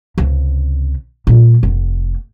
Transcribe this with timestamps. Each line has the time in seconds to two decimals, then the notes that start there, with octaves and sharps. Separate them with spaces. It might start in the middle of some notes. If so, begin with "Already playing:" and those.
0.18 C#2 C3
1.27 A#2 G3
1.63 F1